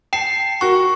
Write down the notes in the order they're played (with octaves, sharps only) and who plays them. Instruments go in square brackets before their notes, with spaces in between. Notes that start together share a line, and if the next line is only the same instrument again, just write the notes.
[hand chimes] G5 C7 [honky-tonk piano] A5 E7
[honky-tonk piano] F#4 A#4 F#5 [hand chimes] C#6